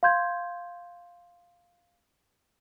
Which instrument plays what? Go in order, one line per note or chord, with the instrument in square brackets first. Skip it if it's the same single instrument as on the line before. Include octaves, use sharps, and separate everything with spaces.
[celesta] F5 C6 G6 G#6